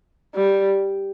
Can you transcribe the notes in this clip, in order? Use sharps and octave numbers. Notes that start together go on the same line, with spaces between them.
G3